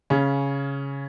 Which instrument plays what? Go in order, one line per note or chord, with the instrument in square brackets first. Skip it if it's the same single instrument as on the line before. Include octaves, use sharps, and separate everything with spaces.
[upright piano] C#3 C#4